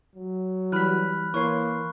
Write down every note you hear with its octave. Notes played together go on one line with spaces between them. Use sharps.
F#3
E3 G3 B5 F6 F#6 B6
E3 A#3 C#5 C6 C#6